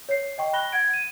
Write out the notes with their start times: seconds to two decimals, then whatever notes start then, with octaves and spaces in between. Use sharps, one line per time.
0.09 C#5 C7
0.38 D#5 G5 C#6
0.53 B5 F#6 A#6 G7
0.72 F#5 G#6 D7
0.94 D#7